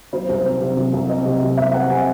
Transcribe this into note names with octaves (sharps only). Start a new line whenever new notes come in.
F#3 C5
C2
C4
C3
F#3
C2
C4 D#5
C3
F#3
C2 E5
C4 F#5
C3 G#5